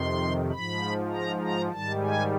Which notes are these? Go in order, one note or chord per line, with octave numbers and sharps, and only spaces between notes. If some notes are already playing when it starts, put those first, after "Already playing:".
Already playing: F2 C3 D#3 C6
G#2 F3 B5
A#5
A#5
G#2 D#3 G3 A5
G#5